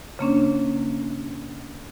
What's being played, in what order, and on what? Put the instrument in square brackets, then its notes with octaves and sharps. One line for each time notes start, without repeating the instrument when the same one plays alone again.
[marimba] C#3 A#3 C#4 D4